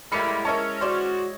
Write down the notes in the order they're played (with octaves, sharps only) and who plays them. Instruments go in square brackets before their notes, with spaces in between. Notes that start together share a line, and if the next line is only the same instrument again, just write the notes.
[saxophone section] A2 G3 A#3 [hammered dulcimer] G#3 E4 [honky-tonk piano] B5 C#7
[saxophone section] C#4 [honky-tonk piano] A#4 A5 [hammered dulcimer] C#5 D#5 E5
[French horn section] F#4 [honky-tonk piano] C5 D5